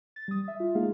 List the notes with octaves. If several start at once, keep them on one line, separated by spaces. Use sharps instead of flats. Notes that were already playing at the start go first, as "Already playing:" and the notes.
A6
G3 D#6
E5
F4
G#3 A#3 D#4 F4 G#4 F5